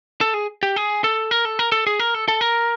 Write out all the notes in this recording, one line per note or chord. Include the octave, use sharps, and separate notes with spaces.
A4
G#4
G4
G#4
A4
A#4
A4
A#4
A4
G#4
A#4
A4
A4
A#4